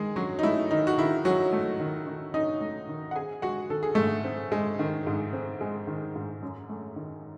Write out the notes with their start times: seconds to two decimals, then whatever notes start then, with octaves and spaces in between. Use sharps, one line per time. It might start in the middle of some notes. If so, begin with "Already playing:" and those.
Already playing: D#3 G#3 G#4
0.16 F#3 C#4 F#4
0.39 D#4
0.43 A3 E4
0.71 D#3 D#4
0.87 F#4
0.98 D#3 E4
1.25 F#3 C#4 F#4
1.53 A3
1.80 D#3
2.07 D#3
2.34 C#4 D#4 D#5
2.61 A3
2.89 D#3
3.11 F#5
3.16 C4 G#4 G#5
3.42 G#3 F#4 F#5
3.70 D#3 A4
3.83 G#4
3.95 G#2 A3 A4
4.24 C4
4.52 G#3
4.79 D#3
5.07 G#2
5.33 C4
5.61 G#3
5.87 D#3
6.16 G#2
6.43 F#2
6.69 A3
6.96 D#3